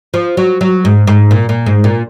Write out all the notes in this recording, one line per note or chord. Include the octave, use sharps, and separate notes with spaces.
F3
F#3
F#3
G#2
G#2
A#2
A#2
G#2
A#2